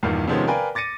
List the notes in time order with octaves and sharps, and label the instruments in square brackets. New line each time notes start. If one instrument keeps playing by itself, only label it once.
[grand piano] E2 G2 A#2 D#3 B3
C3 D#3 F3 G#3 B3 C#4
A#4 B4 D5 F5 G5 G#5
D6 A6 A#6 C#7 D#7